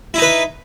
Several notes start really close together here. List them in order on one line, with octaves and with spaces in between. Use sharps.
E4 D#4 B4